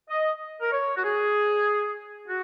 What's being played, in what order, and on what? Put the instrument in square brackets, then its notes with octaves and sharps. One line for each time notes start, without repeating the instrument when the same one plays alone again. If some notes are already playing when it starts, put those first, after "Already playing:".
[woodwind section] D#5
A#4
C#5
F#4
G#4
F#4